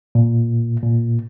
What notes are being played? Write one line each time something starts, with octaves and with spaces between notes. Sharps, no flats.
A#2
A#2